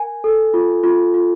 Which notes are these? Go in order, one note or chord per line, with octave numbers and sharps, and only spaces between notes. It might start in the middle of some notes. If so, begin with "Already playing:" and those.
Already playing: A#4 G#5
A4
F4
F4
F4